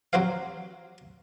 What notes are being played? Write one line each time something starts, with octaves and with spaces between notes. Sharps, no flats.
F#3 C4 F#4 G4 C5 F5